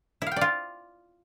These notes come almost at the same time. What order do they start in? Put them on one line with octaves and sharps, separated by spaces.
E4 F5 G5 D5 F4